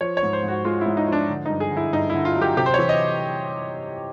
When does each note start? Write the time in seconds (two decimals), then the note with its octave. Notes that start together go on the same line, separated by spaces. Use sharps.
0.01 F3 C#5
0.17 C#5
0.23 G#2
0.33 C5
0.43 G#2
0.48 F#4
0.65 G#3 F4
0.81 G#2 E4
0.97 D#4
1.08 F3 D4
1.29 D3
1.46 G2 D#4
1.60 G#4
1.71 D3
1.77 E4
1.93 G2 D#4
2.10 D3 E4
2.25 F4
2.36 F#3
2.42 G4
2.57 C3 G4
2.66 C5
2.74 E3 C#5
2.89 D#5